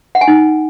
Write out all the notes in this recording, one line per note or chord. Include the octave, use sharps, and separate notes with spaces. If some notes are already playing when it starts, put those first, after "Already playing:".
F#5
G#5
D#4